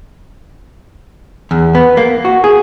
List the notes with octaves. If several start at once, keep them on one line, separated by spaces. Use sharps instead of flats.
E2
B3
A#3
F#4
G#4